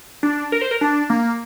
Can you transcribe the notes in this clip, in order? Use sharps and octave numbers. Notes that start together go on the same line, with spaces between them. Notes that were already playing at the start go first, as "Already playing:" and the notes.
D4
A#4
C5
A#4
D4
A#3